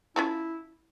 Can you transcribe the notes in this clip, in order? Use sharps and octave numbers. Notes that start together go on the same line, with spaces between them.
C#4 E4 F4 A4